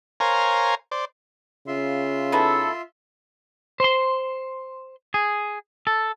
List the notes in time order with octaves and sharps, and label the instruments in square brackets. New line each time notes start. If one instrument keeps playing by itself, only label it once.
[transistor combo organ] A#4 C5 C#5 F5 G#5 A#5
C5 D5
[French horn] C#3 [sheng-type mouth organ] F4 E5 C6
[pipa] B3 D#4 E4 [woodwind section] A4
[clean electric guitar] C5 C6
G#4
A4